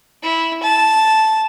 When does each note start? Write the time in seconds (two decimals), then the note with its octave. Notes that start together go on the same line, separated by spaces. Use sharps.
0.23 E4
0.63 A5